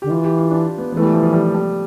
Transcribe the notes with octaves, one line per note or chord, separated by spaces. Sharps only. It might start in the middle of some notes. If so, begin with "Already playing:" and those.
D3 G4
E3 F4
G4
F4
D4
B3
E3 A3 B3
G3
F3
F3
G3
G3